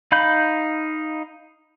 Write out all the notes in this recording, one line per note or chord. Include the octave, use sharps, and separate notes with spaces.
D#4 F5 B5 G6